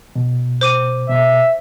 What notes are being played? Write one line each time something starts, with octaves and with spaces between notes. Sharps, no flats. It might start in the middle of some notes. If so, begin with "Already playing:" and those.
B2
C5 D6 D#7
B2 E5